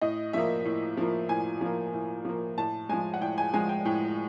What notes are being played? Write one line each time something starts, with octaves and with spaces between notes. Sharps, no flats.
A2 D#5
F3 A#3 E5
A2
F3 A#3
A2 G#5
F3 A#3
A2
F3 A#3
A2 A5
F3 G#3 G#5
F#5
A2 G5
G#5
F3 G#3 G#5
G5
A2 G5